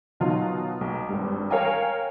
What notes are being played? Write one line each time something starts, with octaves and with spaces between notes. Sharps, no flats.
B2 D#3 F#3 F4
B1
G#1 G2
A#4 C#5 F5 G5 G#5 A#5